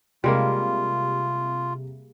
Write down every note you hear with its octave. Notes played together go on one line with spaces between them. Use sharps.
C3 G3 G#3 A#3 F4